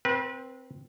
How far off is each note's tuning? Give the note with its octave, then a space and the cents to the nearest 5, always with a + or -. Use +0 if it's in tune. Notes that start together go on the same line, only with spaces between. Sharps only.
C4 +0 B4 -30